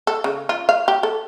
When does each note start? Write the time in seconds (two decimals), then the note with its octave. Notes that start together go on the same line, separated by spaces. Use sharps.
0.07 A4
0.24 C#3
0.49 F4
0.69 F5
0.88 G4
1.03 A4